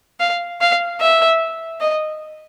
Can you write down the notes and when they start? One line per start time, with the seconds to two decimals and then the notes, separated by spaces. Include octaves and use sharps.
0.20 F5
0.61 F5
1.01 E5
1.81 D#5